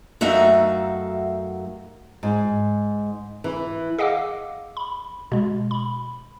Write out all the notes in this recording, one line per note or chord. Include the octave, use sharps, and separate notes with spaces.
F#2 A3 D#4 F#4 E5 F5
G#2
E3
G#4 D#5 F5 F#5 D6 E6
B5
B2 G#3
B5